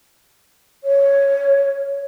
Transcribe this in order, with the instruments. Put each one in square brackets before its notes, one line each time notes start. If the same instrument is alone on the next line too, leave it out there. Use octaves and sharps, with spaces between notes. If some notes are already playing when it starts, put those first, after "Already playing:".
[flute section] C#5